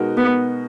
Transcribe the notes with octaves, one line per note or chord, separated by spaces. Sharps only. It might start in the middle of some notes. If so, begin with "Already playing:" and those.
Already playing: B2 G#3 D#4 F#4 A#4
B3